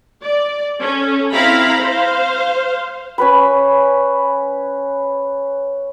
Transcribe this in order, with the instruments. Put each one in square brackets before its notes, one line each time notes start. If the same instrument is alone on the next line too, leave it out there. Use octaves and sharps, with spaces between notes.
[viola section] D5
C#4 A4
C4 E4 F5 A#5 B5
C5 F5
[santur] C#4 B4 B5